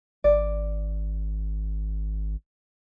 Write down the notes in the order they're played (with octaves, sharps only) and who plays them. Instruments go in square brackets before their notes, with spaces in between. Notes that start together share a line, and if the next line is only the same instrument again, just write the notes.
[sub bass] G#1 [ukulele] D5